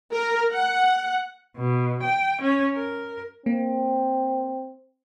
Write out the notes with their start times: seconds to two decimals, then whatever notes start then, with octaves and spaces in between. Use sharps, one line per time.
0.12 A#4
0.52 F#5
1.57 B2
2.03 G5
2.42 C#4
2.75 A#4
3.46 A#3 C4